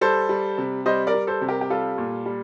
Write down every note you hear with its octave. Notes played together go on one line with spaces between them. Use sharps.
G3 A4 C5
G3
C3
G3 C5 D#5
A#4 D5
G3
A4 C5
C3
G4 A#4
G4
G3 F4 A4
A#2
G3